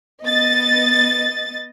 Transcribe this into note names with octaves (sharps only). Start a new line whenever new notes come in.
B3 D#5 A6